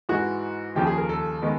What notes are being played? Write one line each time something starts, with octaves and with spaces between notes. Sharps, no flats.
G#2 E3 G#3 F#4
D#2 C#3 F3 G4
G#4
A#4
A4
D#3 G#3 B3